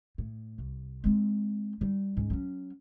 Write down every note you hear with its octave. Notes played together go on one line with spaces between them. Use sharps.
A2
C2
G#3 C4
G3 D#4
C#2 G#2
F#3 C#4